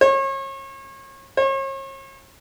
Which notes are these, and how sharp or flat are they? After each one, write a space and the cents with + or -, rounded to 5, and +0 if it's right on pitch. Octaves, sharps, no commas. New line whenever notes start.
C#5 -35
C#5 -40